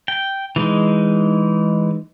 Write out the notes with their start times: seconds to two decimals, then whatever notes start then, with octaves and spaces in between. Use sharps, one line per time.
0.08 G5
0.56 E3 G#3 D#4